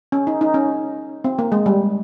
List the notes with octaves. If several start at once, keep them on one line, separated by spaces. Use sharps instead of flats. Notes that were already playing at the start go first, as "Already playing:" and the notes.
C#4
D#4
D#4
C#4
C4
A#3
G#3
G3